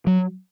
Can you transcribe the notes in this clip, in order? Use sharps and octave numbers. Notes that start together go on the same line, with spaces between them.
F#3